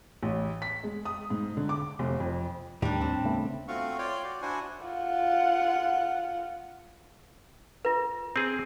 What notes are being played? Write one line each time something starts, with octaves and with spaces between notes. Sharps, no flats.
A1
B6
G#3
D#6
G#2
D3
D6
F1
F2
D#2 A2 D#3 G3 D4 D#4 G4
C4
C#3 A3 B3
A3 C4 F4 F#4 F5 C#6
F4 C#5 D5 F5 G5 C6
F#4 D5
D4 E4 F#4 C5 F#5 G#5
F4 F#5
F4 B4
C4 G#4